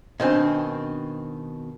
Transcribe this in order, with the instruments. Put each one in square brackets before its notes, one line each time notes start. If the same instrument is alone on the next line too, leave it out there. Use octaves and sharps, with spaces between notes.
[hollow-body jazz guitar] B2 D#3 C4 [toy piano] D4 D#5